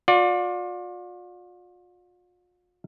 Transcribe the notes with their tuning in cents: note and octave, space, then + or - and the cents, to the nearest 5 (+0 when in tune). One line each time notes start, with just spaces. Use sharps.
F4 +40 D5 -5